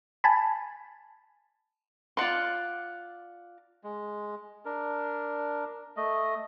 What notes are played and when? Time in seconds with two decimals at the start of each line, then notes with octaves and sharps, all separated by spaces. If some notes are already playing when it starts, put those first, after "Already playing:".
0.24 G#5 A5 B5
2.17 F4 D5 F#5 C6
3.84 G#3
4.65 D4 A#4
5.97 A3 D#5